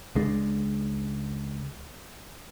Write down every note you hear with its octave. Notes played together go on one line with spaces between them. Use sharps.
C#2 G#3 D4